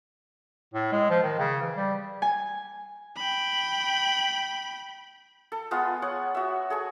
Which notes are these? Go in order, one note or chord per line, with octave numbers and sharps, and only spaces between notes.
A2
G#3
F3
D#3
C#3
E3
G3
G#5
G5 B5
A4
G#3 B3 F4
C#5 F#5
F#4 E5
G#4 A4 C#6